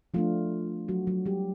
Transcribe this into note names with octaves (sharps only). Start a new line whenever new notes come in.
F3 A3 D4 F4
F#3 F#4
F#3 F#4
G3 G4